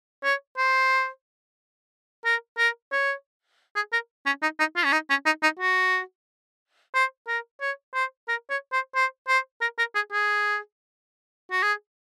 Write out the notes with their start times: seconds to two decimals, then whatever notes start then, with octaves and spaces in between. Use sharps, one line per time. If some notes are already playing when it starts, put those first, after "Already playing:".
0.24 C#5
0.57 C5
2.25 A#4
2.58 A#4
2.92 C#5
3.76 G#4
3.93 A#4
4.26 C#4
4.42 D#4
4.59 D#4
4.76 F4
4.85 C#4
4.92 D#4
5.10 C#4
5.26 D#4
5.43 D#4
5.59 F#4
6.94 C5
7.28 A#4
7.61 C#5
7.94 C5
8.28 A#4
8.50 C#5
8.72 C5
8.95 C5
9.28 C5
9.61 A#4
9.78 A#4
9.95 G#4
10.12 G#4
11.51 F#4
11.63 G#4